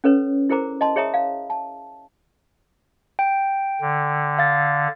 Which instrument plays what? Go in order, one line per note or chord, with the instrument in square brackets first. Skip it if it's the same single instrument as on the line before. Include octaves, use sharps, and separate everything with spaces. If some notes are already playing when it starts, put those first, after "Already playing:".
[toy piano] C#4 A4 B4 C#5
E4 G#4 A#4 C5 A#5 D6
D#5 A5 C6
G#4 C#5 E5 A#5 D#6
F5
A5
[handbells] G5
[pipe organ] D3
[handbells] F5 A6